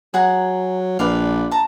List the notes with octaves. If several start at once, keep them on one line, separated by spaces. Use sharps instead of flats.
F#3 G#4 F#5 A#5
A#1 B4 D5 F5
A5 A#5